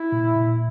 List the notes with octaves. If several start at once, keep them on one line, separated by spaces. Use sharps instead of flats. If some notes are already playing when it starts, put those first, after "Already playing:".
Already playing: E4
A#2
A#2